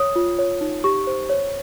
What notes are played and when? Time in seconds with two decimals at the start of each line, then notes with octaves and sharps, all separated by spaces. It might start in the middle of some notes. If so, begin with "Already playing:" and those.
Already playing: C#5 D#6
0.16 F4
0.39 C#5
0.61 D#4
0.84 G4 C#6
1.07 C5
1.30 C#5